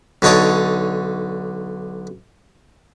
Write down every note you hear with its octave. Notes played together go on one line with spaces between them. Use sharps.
B1 D3 D#4 C#5 A5 D6